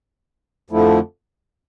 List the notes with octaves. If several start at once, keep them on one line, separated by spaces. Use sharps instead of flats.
F2 D3 F3 A3 E4